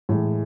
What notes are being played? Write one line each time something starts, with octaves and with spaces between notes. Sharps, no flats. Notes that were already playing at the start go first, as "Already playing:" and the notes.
A2 E3 G#3